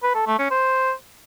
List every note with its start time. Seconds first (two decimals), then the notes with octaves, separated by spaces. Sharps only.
0.03 B4
0.15 A4
0.27 A3
0.39 C#4
0.51 C5